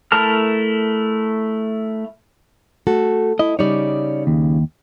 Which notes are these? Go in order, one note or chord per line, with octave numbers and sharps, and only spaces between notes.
A3 E4 A#4 A5 F6
A3 F#4 A4
E4 D#5
C#3 G3 D#4 C#5 D5
D#2